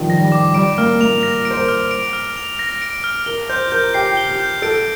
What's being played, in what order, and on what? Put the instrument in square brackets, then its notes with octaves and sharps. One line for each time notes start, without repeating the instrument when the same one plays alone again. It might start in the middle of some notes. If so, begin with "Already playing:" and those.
Already playing: [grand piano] D#3 F3 G3
[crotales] A#6
[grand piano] G3
[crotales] D6
[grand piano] G3 [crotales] D7
[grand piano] A#3 [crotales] F6
[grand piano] A#3 [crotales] F7
[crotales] A#6
D7
[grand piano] C5
A#4
[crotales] F6
D7
F6
F7
A#6
D7
F6
[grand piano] A#4 [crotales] G7
[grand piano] C5 [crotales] G6
[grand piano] A#4 [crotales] G6
[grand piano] G4 [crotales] C7
[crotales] G7
[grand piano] G4
[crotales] G6
[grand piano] A4 [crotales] D7